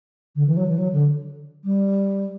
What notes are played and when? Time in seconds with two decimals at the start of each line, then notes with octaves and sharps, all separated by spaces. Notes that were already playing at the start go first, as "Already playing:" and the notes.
0.35 D3
0.46 E3
0.56 F#3
0.67 E3
0.78 F#3
0.92 D3
1.64 G3